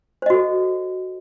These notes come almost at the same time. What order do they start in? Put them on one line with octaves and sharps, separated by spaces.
C5 D#5 F#4 A4